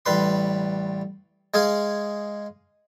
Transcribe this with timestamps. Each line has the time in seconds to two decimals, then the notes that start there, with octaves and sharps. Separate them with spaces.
0.06 A1 G3 B4 C6
1.54 G#3 G#4 F5 G#5